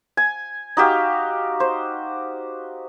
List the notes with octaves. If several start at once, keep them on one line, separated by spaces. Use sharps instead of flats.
G#5
D#4 F#4 G4 F5
C5